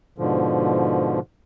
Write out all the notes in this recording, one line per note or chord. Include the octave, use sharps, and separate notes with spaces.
G#2 B2 D3 F3